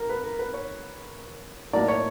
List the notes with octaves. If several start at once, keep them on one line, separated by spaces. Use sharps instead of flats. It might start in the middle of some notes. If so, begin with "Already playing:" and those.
Already playing: A#4
B4
A#4
B4
C#5
A2 F#3 A#3 D#4 D5
C#5